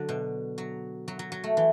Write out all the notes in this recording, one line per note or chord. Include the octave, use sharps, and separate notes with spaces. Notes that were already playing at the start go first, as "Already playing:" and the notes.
Already playing: D3 F#3
B2
F#3
F#3
F#3
F#3
A3
E3